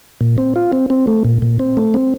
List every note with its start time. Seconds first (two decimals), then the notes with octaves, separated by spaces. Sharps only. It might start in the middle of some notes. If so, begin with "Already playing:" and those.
0.21 A#2
0.38 C4
0.56 F4
0.72 C4
0.90 C4
1.07 A3
1.25 A#2
1.42 A#2
1.59 C4
1.77 A3
1.94 C4